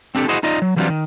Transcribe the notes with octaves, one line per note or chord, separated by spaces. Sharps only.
C4 D4 G4 A4
E4 F#4 G#4 C5 D#5 F#5
D#4 F4 D5 D#5
F#3
E3 F#3 G3 C4 D4 F4
D#3